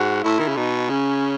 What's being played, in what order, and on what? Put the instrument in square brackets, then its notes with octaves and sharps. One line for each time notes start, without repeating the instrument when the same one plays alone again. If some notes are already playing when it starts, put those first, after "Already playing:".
Already playing: [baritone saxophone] G#2 [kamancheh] F#4
[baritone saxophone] A2 [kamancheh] E4
[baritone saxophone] D#3
C#3
[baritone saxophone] B2 [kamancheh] D#4
[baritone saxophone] C#3 [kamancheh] C#4